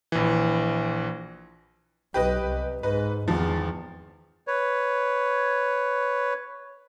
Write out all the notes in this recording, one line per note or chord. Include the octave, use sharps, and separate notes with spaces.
A#1 E3
B1 G4 B4 D#5
C2
G#2 D#4 B4
G#1 E2 F3
B4 C#5